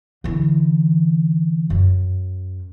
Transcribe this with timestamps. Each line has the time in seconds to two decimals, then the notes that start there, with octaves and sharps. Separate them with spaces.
0.24 D3 E3
1.70 F#2